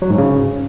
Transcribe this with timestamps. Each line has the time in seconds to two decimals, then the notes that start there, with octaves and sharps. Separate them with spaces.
0.02 F#3
0.10 G#2
0.18 C#3